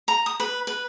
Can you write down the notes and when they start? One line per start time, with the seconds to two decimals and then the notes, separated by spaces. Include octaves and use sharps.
0.08 A#5
0.26 D#6
0.40 B4
0.67 B4